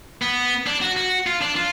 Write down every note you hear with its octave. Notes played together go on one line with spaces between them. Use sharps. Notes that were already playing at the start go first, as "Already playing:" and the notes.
B3
D4
F#4
F#4
F4
D4
F4